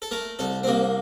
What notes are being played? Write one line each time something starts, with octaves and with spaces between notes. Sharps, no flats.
A4
A3 A#4
C2 A4
C4
C2 A#3